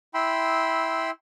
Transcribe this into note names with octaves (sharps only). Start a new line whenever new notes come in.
E4 G5 B5 C6 E6